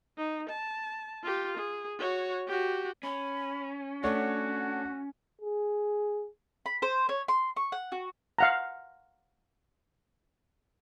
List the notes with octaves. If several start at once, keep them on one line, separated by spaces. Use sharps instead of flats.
D#4
A5
F4 G4
G#4
F#4 C#5
F#4 G4
C#4 B5
A3 D4 F#4 C#5 F#5
G#4
B5
C5
C#5
C6
C#6
F#5
F#4
F5 F#5 A#5